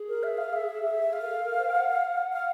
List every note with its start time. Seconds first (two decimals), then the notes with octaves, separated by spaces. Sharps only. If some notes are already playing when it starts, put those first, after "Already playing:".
Already playing: G#4
0.09 A#4
0.23 E5
0.38 F5
0.53 E5
0.83 E5
1.13 G#4 F5
1.21 A#4
1.28 A4
1.43 A#4
1.58 C5
1.69 G5
1.72 F#5
2.32 F5